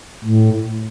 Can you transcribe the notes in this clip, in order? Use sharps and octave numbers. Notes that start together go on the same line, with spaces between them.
A2